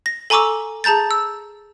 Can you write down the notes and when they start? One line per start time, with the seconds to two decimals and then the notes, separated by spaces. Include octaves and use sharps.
0.06 A#6
0.30 A4 G#5 A#5 C#6 D6 E6
0.84 G#4 A5 A#5 G6 A6
1.11 E6